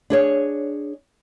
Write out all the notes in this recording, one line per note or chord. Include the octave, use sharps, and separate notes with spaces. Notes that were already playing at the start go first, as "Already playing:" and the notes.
D4 G#4 C#5